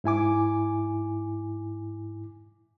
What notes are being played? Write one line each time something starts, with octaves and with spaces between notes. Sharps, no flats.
G#2 E4 G#5 D6